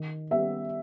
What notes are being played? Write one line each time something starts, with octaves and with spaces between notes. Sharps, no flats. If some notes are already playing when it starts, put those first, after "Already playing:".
Already playing: D#3
G3 B3 E5